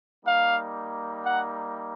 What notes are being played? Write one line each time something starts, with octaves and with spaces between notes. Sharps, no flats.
G3 A#3 D#4 F5
F#5